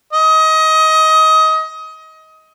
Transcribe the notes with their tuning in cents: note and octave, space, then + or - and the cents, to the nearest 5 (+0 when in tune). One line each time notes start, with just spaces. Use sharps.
D#5 +25